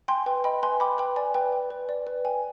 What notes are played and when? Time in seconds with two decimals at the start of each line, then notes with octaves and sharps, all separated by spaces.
0.08 G5 G#5 C6
0.26 B4 G5
0.44 D#5 G5 B5
0.63 B4 G#5 C6
0.80 G5 B5 D6
0.98 B4 G5 B5
1.16 D5 G#5
1.34 B4 G5
1.52 G5
1.70 B4
1.89 D5
2.07 B4
2.25 G5 G#5